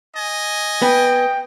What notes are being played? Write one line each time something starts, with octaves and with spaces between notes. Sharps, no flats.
D#5 G#5
B3 G5